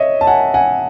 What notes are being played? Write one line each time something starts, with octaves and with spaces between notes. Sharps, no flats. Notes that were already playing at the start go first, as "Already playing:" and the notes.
Already playing: C#5 D#5 E5
A5
F#5 G#5
F#5 G#5